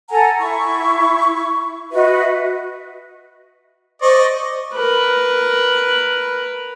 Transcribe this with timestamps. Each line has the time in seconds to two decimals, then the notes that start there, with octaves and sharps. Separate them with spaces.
0.09 A4 F#5 G#5 A#5
0.39 E4 C#6
1.92 F#4 B4 D#5 E5
4.02 C5 D5 D#5 C#6
4.74 A#4 B4